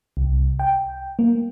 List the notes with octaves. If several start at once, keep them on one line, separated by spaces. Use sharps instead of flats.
C2
G5
A#3